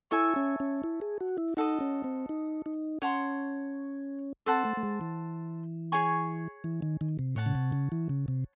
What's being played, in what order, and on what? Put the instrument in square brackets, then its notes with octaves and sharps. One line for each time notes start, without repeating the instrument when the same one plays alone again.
[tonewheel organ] E4 [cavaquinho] A4 C#5 E5 G#5
[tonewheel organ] C#4
C#4
E4
G#4
F#4
E4
[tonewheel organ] D#4 [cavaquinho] F#4 A4 D#5
[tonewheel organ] C#4
C4
D#4
D#4
[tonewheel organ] C#4 [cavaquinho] C#5 F#5 A5 C6
[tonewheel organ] C4 [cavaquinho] A4 C5 F#5 A5
[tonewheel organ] A3
A3
G#3
E3
[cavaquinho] G#4 C#5 G#5 C#6
[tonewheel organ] E3
D#3
D#3
C3
[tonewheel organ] A2 [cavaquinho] C#5 F#5 A5
[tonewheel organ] C#3
C3
C#3
E3
C#3
C3